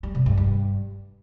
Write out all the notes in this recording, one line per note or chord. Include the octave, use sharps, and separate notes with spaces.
G3
C3
G2
G2